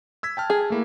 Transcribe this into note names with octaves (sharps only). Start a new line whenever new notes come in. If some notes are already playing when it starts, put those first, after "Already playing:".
E6 G#6 B6
G5 A5 F6
G#4
A3 A#3 E4